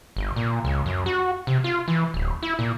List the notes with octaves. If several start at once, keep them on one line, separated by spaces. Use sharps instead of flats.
G1
A#2
C#2
F#2
F#4
C3
F4
E3
D1
E4
A#2